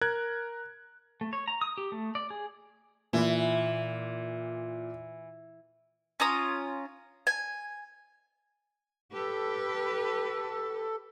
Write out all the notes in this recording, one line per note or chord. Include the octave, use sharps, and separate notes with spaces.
A#4 F#6 G#6
A3
C#5
A#5
D#6
G4
A3
D5
G#4
A#2 E3
C#4 F4 A#5 D#6
G#5
G4 A4 B4